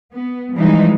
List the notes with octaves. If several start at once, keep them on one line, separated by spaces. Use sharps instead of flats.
B3
E3 F3 G3 G#3 D#4